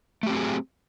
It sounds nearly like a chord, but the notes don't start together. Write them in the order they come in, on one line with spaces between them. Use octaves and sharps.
A3 G4 C4 F#3 G#4